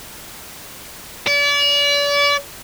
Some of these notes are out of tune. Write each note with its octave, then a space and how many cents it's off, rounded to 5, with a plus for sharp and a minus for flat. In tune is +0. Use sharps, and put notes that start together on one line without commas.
D5 -40